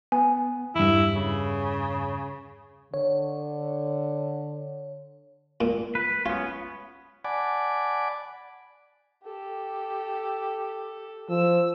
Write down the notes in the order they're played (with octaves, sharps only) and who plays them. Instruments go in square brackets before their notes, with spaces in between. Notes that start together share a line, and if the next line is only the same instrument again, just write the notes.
[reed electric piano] B3 [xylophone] G#5
[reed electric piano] E2 G2 [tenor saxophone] E4
[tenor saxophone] C#3
[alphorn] D3 [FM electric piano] C#5
[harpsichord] A#2
[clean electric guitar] B4
[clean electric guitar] B3 C#4 [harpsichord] F4
[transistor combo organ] D5 F#5 G#5 A5 B5 D6
[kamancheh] G4 A4
[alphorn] F3 [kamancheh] E6